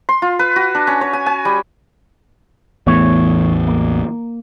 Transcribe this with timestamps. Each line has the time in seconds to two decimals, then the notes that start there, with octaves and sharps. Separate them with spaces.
0.09 C6
0.22 F4
0.39 B4
0.56 F#4
0.75 D4
0.87 C#4
1.01 C#5
1.13 G#5
1.26 G#5
1.45 G3
2.87 A1 E2 E3 A3 B3 C#5
3.68 A#3